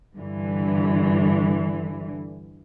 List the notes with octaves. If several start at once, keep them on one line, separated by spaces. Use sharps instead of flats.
G2 D3 E3